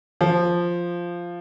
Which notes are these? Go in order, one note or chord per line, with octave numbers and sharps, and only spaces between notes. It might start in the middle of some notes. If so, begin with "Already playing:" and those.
F3